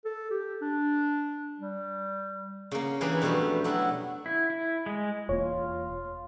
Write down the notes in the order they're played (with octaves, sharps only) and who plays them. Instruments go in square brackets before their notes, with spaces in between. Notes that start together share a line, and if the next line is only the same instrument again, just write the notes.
[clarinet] A4
G4
D4
G3
[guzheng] C#3 A#3
E3 G3 A#3 D4 G#4 B4
F2 B2 G3 A3 D4
F#3 B3 D4 E4 A4
[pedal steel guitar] E4
E4
G#3
[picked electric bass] E1 A#3 [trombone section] F4 [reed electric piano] C#5